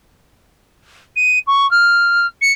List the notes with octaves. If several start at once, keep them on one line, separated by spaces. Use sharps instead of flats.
D#7
C#6
F6
C#7